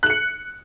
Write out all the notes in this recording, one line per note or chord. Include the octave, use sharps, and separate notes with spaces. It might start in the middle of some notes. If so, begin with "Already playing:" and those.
F#6 C#7 F#7